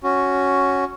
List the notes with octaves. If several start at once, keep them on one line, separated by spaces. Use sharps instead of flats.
C#4 F#4